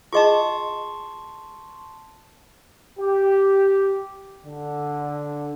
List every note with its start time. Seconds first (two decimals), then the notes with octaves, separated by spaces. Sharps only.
0.13 F4 G#4 D#5 A5 C6 C#6
3.00 G4
4.45 D3